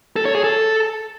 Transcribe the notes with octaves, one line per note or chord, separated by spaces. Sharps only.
A4
C#5
G#4
A4